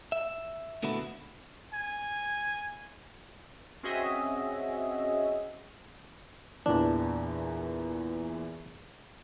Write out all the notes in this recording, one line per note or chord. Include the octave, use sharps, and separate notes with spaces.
E5
A#2 D3 A3 B3 E4 F#4
G#5
C4 C#4 F#4 G#4 D#5 E5
E2 A#2 E3 D4